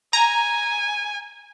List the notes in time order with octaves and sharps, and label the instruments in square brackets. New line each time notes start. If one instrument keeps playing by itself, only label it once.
[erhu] G#5 [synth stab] A#5